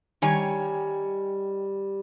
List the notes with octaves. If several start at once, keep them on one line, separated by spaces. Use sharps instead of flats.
D#3 G3 C#5 G#5